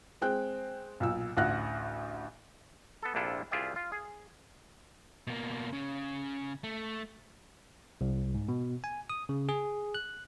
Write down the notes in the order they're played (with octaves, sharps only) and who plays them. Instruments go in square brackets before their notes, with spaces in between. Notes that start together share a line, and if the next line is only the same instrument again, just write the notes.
[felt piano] G#3 C4 G5 F#6
B1 A#2 E6
A1 D2 F5 F#5 F#6 A#6
[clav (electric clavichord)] B3 A4
A#1 C3 D4 E4 F4 A4
C2 F4 G#4 D5 E5 G5
F4
G#4
[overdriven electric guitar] B2 A#3
C#3
A3
[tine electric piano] C2
G#2
B2
G#5
D#6
C#3
G#4
F#6